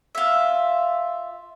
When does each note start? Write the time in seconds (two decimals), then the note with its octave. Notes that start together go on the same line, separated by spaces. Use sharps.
0.15 F4 E5